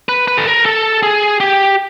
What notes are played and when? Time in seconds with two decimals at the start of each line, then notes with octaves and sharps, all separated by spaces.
0.09 B4
0.28 B4
0.38 A4
0.47 A#4
0.66 A4
1.03 G#4
1.40 G4